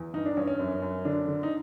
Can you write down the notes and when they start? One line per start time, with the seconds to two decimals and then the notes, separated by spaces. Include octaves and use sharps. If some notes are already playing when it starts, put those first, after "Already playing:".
Already playing: E2
0.13 G2 D#4
0.26 D4
0.37 G2 C#4
0.47 C#4
0.59 F#2
0.82 F#2
1.05 D3 D4
1.28 D3
1.43 D#4